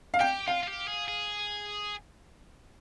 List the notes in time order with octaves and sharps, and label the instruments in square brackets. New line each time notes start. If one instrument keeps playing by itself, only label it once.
[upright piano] F5
[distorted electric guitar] G4 [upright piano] G5
[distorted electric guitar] F4 [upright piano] F5
[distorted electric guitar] F4
G4
G#4
G#4